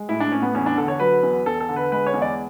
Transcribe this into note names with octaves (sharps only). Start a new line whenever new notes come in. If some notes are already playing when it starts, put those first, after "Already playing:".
Already playing: G#3
A2 E4
D4
A2 C#4
B3
E2 C#4
D4
D3 A4
C#5
F#3 B4
E2
E2 A4
A4
D3
B4
G#3 B4
C#5
E2
D5